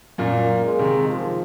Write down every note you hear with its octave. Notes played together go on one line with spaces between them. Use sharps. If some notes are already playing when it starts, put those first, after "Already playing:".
F#2 A#2 A#3
G#3
C3 D#3
F3